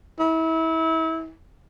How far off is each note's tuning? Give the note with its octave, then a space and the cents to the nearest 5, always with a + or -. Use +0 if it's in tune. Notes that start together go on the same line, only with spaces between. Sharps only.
E4 -30